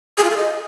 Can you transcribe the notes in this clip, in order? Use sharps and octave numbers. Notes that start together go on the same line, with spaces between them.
G#4
F4
A4
D#5